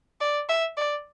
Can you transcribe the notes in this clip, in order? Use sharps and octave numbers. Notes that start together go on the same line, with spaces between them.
D5
E5
D5